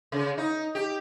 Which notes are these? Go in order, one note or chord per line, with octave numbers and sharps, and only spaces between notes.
C#3
D#4
G4